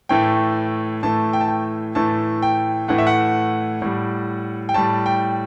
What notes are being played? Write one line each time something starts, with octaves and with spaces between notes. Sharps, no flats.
A2 E3 A3 G5
A2 E3 A3 A5
G5
A5
G5
A2 E3 A3 A5
G5
A2 E3 A3 F#5
E5
F#5
A2 G3
G5
A2 G3 A5
G5